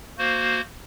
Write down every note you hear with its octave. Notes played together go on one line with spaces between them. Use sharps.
A#3 F#4 C5